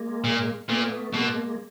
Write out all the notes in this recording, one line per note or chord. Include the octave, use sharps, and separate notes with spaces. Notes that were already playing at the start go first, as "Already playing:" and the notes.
Already playing: G#3 A#3
A#2
A#2 A3 B3
B2 G#3 A#3